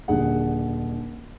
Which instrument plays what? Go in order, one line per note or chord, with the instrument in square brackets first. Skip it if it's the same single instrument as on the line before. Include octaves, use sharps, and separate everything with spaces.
[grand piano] D#1 D3 G#4 F#5